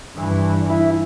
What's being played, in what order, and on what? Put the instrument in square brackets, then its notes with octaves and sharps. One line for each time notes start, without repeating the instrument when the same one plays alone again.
[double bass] G2 E3
[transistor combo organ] E4